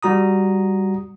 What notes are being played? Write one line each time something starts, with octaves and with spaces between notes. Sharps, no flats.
G3 F#4 A#5 D#6